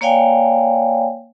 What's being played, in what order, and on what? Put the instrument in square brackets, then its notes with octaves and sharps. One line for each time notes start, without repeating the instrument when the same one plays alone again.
[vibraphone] A#3 C#5 D5 F5 G5 G#5